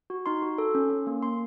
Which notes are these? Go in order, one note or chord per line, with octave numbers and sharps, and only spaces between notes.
F#4
D#4 C6
F#4
A4
C#4
C#4
A#3
A#3 C6